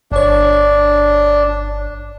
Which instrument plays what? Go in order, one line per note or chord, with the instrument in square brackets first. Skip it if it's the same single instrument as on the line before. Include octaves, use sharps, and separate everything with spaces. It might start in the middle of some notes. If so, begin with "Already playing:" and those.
[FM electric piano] G1 C#5 [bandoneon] D4